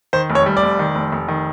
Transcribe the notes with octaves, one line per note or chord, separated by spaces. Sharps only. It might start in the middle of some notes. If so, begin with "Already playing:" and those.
D#3 C5
F1
C#5
G3
D5
F1
D#3
F1
F1
D#3